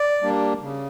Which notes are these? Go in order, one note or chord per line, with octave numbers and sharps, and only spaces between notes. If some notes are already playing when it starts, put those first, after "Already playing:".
Already playing: D5
G3 A#3 D4
C#3